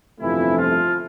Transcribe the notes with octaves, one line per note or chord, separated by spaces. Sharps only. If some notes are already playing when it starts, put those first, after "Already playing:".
G1 F2 C3 E3 F3 A3 E4
F3 F4